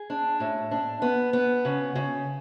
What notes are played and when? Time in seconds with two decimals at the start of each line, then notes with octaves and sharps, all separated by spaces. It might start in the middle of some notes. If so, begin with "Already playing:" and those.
Already playing: G#4
0.10 D4
0.40 A2
0.71 D4
1.02 B3
1.33 B3
1.65 C#3
1.95 C#3